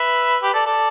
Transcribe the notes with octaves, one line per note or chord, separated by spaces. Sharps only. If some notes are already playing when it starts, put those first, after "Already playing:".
Already playing: B4 E5
G4 B4
A4 D5
A4 D5